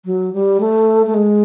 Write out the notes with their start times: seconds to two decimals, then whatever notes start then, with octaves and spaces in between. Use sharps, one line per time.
0.05 F#3
0.33 G3
0.60 A3
1.06 A3
1.14 G#3